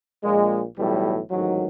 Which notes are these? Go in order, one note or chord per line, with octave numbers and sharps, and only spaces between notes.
A#1 A#2 G#3
B1 A2 E3 G3
A1 G#2 D#3 F#3